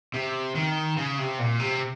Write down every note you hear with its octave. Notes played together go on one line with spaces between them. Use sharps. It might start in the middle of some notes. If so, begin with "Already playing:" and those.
C3
D#3
C#3
C3
A#2
C3